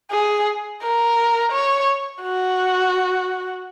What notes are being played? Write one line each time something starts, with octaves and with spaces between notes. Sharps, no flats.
G#4
A#4
C#5
F#4